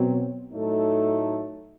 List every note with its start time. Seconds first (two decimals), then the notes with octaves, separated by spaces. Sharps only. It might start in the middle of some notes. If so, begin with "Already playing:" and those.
Already playing: B2 F#3 C4
0.50 A2 F#3 A3 D#4 A4